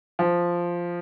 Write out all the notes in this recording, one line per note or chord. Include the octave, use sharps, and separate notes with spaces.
F3